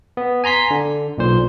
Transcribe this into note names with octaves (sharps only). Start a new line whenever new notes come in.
B3
G#5 A#5 C6 B6 C7
D3
B1 A#2 C5